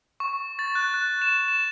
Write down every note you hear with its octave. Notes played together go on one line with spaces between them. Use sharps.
C#6
A6
F#6
F#6
E7
E7